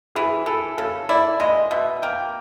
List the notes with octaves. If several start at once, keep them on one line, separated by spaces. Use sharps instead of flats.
E3 G#4
E3 A4
C#3 A4
E4 D5
G#3 D#5
B2 E5
A#3 G5